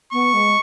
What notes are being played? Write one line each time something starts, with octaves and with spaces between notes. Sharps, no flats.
B3 C#6
G#3